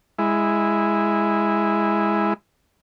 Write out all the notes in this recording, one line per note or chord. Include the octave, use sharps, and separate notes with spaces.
G#3 E4